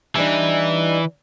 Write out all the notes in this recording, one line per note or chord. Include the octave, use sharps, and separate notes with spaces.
E3 G3 D4 D#4